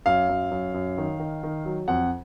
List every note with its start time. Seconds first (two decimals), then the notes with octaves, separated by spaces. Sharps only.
0.06 F#2 F5
0.29 F#2
0.51 F#2
0.74 F#2
0.98 D#3
1.19 D#3
1.43 D#3
1.65 F#3
1.88 F2 F#5